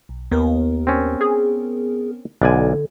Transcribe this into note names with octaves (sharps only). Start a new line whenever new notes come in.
B1
D#2 B3 A#4
C4 C#4
G#4
B1 D3 D5 G#5